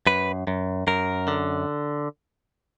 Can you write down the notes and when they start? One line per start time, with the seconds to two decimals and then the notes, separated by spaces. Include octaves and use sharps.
0.07 F#2 B4
0.47 F#2
0.87 F#2 A#4
1.28 D3